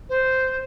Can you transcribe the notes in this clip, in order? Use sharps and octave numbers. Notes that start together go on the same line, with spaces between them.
C5